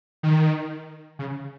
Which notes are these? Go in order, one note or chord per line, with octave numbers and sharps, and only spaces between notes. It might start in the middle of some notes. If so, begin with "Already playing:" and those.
D#3
C#3